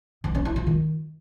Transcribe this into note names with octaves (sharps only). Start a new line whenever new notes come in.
D#3
C#4
E4
F4
D#3